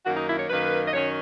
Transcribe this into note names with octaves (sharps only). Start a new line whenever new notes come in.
F#2 D#3 A#3 F#4
D#4
E4
C#5
F#2 D#3 A#3 B4
D#5
F#2 D#3 F#3 C#4 C#5